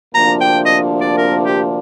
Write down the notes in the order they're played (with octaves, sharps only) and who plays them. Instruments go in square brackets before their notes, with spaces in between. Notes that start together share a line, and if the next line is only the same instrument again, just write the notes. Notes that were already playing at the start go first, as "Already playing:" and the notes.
[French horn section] D2 C3 F3 A#3 D4 [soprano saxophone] A#5
[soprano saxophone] G5
D#5
D5
A#4
G4